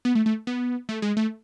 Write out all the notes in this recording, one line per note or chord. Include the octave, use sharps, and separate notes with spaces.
B3
A3
A3
B3
A3
G#3
A3